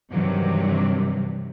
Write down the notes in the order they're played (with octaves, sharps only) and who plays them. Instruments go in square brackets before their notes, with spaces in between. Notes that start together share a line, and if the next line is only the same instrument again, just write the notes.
[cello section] G2 C3 D#3 E3 F#3